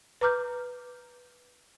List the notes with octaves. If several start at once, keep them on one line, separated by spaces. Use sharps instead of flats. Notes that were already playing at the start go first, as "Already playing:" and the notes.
B4 A#5 D6 F6 G6